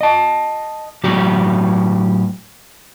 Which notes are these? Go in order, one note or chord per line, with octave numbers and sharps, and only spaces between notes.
D#5 A5
A2 F#3 F#4 G4